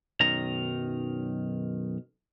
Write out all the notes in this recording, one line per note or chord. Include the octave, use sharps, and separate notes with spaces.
B1 F#2 D#3 A#5